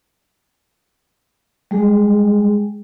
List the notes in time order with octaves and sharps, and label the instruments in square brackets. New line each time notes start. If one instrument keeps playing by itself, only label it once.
[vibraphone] G3 G#3 G#4